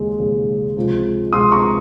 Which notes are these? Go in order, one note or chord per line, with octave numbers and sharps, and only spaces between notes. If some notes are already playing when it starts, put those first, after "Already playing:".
Already playing: D#2 C#3 G#3
D#2 C#3 G#3
C#2 C3 F3 G#3
C#2 C3 F3 G#3 C6 D#6
A#5 C#6